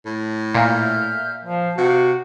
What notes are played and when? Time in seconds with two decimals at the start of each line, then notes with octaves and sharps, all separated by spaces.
0.06 A2
0.54 A#2 E5 F6 G6
1.45 F3 F5
1.78 C3 F#4